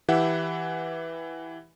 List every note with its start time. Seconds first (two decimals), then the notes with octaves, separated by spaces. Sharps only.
0.09 E3 E4 G4 E5 F#5